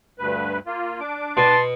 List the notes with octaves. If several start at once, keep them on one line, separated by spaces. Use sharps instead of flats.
D2 G2 B4
A#3 F4
D4 D6
B2 A5 C6